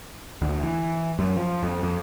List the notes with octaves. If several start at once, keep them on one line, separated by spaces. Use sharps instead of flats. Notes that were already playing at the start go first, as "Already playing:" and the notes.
D2
E3
F#2
F3
F2
F2